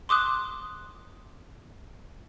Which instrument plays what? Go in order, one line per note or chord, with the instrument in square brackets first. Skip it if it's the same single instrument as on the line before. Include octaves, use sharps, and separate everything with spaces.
[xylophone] C6 D6 D#6 F#6